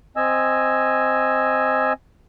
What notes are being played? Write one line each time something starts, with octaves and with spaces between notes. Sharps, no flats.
C4 D#5 G#5 E6